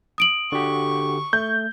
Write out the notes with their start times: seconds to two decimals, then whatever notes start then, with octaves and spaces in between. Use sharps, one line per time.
0.18 D#6 D7 F#7
0.52 D3 F#4 G4 C#6
1.33 A3 G6